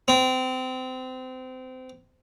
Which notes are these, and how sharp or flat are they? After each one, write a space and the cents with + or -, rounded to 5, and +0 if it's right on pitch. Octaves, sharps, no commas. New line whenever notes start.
C4 -25